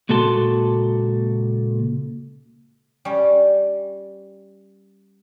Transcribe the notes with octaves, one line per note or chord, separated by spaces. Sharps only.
C#2 A#2 F#4 A4 A5 C6
G3 C#4